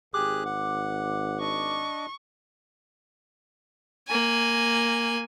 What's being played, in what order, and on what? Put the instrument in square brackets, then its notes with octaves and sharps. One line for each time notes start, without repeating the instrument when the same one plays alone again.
[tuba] G#1 [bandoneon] G4 G#4 F#6 [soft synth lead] D6
[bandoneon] F#5
[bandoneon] D4 D#5 [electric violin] C#6
[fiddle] A#3 G#5